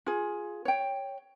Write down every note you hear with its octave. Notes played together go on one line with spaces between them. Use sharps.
F4 G#4
C#5 G5